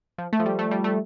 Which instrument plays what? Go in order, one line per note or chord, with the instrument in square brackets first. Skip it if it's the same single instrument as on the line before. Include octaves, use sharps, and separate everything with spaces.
[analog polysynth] F3
A3
F3
G3
A3
G3
A3